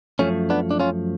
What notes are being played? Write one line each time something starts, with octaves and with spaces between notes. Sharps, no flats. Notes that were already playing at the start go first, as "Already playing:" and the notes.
F#2 F3 A3 C#4
B3 D4
D4
C#4 F4